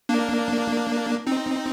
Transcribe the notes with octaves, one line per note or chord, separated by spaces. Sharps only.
A#3 D4
C4 D#4